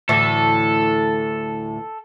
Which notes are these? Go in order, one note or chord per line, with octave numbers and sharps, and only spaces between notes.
D2 A2 E3 A4